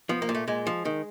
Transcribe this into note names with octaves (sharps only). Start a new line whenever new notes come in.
F3 B3
A#3
A#2
A3
A#2 G#3
F3
D#3